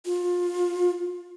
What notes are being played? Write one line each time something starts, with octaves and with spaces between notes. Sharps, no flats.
F4